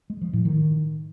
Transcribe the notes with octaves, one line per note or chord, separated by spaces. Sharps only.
G#3
F3
A2
D#3